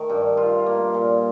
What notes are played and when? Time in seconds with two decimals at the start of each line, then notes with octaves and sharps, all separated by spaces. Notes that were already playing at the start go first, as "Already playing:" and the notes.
Already playing: D#3 A3
0.09 G2
0.37 F4
0.66 A#3
0.94 A#2